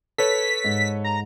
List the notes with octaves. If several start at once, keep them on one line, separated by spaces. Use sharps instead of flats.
A4 B4 C#5 B6
G#2
A#5